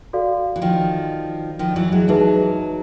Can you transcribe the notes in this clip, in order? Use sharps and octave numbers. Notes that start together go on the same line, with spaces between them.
F#4 A4 D5 F5
E3
D#3 F3
D#3 F3
E3 F#3
F#3 G#3
F#3 G#3 D#4 G#4 B4 E5 A5